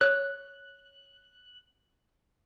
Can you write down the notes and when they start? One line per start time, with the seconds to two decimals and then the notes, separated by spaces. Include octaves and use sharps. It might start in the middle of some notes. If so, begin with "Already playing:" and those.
0.01 C#5 F#6